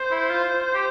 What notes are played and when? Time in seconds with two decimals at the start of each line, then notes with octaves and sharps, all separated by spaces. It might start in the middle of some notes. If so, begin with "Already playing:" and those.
Already playing: C5
0.11 E4
0.30 F4
0.74 G4